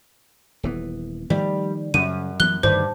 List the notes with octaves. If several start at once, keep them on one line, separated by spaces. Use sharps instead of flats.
D#1 E3 B3
D#3 F3 G3 A3
F#2 C#3 F#3 D#7
E3 F#3 B3 F#6 G7
D1 G2 D3 D#3 C5